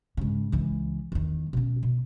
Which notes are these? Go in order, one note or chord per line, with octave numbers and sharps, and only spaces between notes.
G#2 C#3
C#2 E3
E2 D#3
B2 C#4
B2